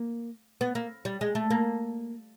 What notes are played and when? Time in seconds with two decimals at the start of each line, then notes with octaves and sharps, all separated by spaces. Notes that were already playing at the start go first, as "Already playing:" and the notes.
Already playing: A#3
0.61 B3
0.75 A#3
1.05 G3
1.21 G#3
1.35 A3
1.50 A#3